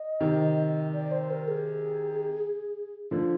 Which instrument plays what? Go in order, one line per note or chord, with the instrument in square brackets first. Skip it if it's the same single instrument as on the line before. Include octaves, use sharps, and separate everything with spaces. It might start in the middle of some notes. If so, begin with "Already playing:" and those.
Already playing: [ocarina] D#5
[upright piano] C3 D#3
[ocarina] D5
C5
A#4
G#4
[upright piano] D3 F3 [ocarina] F4